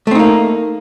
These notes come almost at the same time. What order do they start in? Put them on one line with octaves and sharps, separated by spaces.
A3 C4 D#4 A#3